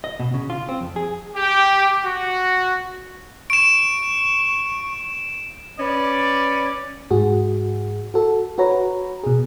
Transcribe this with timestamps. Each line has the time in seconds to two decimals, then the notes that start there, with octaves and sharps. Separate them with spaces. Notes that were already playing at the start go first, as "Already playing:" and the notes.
0.04 D#5
0.20 B2
0.34 C#3
0.50 F4
0.69 C4
0.81 F2
0.96 G#4
1.36 G4
2.03 F#4
3.50 C#6 D7 E7
5.79 C#4 B4 D5
7.11 G#2 F#4 G#4
8.14 F#4 A4
8.58 F#4 B4 C#5 A#5
9.24 B2 G#4